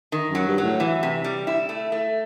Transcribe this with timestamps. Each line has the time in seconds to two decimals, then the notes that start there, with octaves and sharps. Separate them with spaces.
0.12 D#3
0.29 F#2
0.35 F#3
0.46 G2
0.58 F#3
0.63 A2
0.80 E3
1.03 C3
1.24 G3
1.47 E4
1.69 A3
1.92 A3